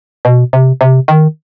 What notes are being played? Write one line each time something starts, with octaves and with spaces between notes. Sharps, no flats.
B2
C3
C3
D#3